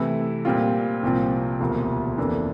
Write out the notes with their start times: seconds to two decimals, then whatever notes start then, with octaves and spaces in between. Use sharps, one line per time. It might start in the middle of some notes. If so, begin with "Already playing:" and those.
Already playing: C3 E3 A3 E4
0.45 A#2 G3 C4 F4
1.02 C2 A#2 F3 C4
1.60 E1 D2 C3 F3 A#3
2.18 F2 E3 A#3 D4 A4